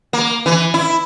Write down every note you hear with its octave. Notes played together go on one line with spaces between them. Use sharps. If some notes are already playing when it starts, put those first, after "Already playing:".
A#3
E3
E4